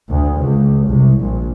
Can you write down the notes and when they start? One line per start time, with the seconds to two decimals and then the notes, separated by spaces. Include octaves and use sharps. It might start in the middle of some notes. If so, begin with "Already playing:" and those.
0.10 D2
0.42 C#2
0.88 C2
1.19 A#1